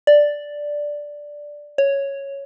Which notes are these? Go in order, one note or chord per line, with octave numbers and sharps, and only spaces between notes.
D5
C#5